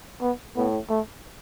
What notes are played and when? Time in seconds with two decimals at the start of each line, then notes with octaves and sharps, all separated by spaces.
0.21 B3
0.56 A2 B3
0.90 A3